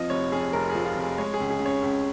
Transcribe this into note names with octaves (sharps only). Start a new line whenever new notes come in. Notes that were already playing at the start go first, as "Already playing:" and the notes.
Already playing: F2 F3 D#5
F1 C#5
F2 G#4
F1 A#4
G#4
F3
F4
F1 G#4
G#3 C#5
G#4
C#2
G#4
C#3
C#5
C#2